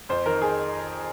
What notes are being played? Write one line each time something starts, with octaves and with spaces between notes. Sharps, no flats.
F2 C5
D#3 A#4
G#4